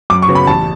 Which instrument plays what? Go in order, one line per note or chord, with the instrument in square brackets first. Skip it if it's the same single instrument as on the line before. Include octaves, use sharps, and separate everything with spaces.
[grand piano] F#2 D6
C#6
C#3 F#3 B3
B5
A1 A5